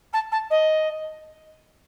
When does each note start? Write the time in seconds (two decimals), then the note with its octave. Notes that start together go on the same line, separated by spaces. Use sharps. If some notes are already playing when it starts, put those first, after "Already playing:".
0.13 A5
0.31 A5
0.50 D#5